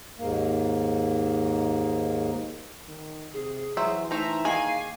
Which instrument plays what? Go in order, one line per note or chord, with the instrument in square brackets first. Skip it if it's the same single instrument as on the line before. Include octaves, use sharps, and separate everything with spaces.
[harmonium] D#2 G#2 A#3
[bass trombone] D#3
[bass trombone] C3 [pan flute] G#4
[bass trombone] E3 [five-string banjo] F#3 C5 E5
[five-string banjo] A3 C5 [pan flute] D#4 [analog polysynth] E5 A#5
[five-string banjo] D#3 A#3 G#4 [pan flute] F5 [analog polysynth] G#5